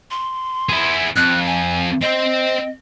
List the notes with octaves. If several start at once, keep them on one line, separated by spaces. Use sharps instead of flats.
C6
E4 G#4
F2 F#6
G#5
C4 C5 D#5